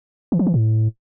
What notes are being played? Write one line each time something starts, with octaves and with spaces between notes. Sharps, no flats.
E3
F3
E3
A2